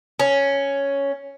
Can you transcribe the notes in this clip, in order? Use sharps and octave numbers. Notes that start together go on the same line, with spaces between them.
C#4